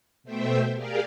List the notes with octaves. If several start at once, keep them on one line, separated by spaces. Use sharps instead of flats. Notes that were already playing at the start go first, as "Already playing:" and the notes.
B2 A3 C5 E5 G5
G4 G#4 A#4 D5 F5